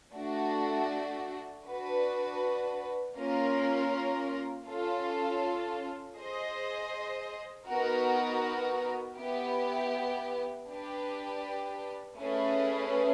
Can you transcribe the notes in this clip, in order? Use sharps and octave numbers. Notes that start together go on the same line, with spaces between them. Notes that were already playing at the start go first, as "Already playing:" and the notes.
A3 D4 F#4
D4 F#4 B4
A#3 C#4 F4 A#4
C#4 F4 A4
G#4 C5 D#5
B3 D#4 F#4 A#4
B3 E4 G4
D4 G4 B4
A3 C#4 E4 G#4 B4